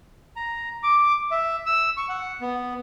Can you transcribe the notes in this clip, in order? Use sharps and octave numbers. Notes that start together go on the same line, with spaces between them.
A#5
D6
E5
E6
C#6
F#5
B3